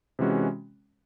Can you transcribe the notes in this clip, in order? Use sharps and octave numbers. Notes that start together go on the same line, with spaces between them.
C3 E3 G#3 C#4 F#4